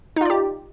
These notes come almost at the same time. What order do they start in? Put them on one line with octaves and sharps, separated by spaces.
D#4 F4 D5 G4